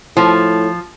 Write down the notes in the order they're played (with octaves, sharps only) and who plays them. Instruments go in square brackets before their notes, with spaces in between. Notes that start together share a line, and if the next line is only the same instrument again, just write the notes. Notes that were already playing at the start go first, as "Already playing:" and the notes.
[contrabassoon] A2 [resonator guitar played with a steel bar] F3